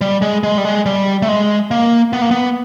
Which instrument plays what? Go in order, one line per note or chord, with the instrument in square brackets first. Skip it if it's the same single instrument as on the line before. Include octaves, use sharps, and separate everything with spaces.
[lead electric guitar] G3
G#3
G#3
G3
G#3
G3
A3
G#3
A#3
B3
A#3
B3